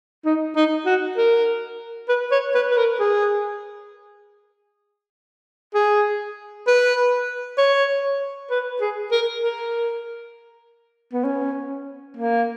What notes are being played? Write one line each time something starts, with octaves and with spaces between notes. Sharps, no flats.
D#4
D#4
F#4
A#4
B4
C#5
B4
B4
A#4
G#4
G#4
B4
C#5
B4
G#4
A#4
A#4
B3
C#4
A#3